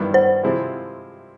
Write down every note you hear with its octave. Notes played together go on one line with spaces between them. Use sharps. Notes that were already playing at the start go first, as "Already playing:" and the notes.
Already playing: G2 D#3 G3 B3 E4
C5
C3 F3 G#3 C4 E4